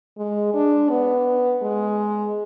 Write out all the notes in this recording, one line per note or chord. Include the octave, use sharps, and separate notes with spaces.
G#3
D4
B3
G#3